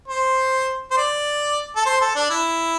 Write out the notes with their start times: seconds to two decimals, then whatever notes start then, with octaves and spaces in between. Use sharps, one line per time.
0.08 C5
0.91 C5
0.97 D5
1.76 A4
1.86 C5
2.01 A4
2.16 D4
2.30 E4